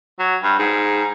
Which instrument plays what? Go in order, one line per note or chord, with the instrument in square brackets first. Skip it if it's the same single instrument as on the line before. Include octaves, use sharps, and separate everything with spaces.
[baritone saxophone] F#3
G2
G#2